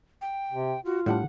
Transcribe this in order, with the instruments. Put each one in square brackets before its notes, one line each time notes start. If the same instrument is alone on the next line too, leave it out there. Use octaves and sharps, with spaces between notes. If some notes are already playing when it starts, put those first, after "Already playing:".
[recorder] G5
[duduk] C3
[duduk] F4 [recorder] F#4
[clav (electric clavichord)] A2 G3 D4 [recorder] F#5